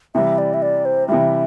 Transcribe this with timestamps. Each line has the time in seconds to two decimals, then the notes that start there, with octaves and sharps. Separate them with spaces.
0.15 C3 E3 G3 E5
0.38 D5
0.54 E5
0.62 D5
0.85 C5
1.08 C3 E3 G3 E5